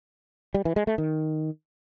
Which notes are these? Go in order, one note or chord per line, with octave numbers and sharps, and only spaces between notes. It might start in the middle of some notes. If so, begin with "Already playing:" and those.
G3
E3
G#3
A3
D#3